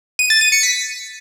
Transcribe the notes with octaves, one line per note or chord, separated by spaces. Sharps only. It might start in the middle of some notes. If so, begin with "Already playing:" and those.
D#7
A6
D#7
C#7
B6